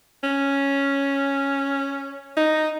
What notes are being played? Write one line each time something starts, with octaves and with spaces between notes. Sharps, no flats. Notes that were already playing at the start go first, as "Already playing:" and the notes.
C#4
D#4